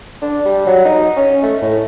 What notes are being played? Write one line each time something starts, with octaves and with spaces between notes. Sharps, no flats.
D4
G3
F#3
D#4
C#4
A3
A2